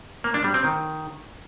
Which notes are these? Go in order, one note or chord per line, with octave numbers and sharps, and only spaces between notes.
A#3
D4
G3
C4
D#3